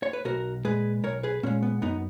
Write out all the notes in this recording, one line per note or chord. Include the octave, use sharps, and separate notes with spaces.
C#5
B4
B1 F#4 A#4
A#2 G#3 G#4 B4
B1 A#4 C#5
G#4 B4
A#2 G#3 A#3 C#4
B3
F#2 B3 D#4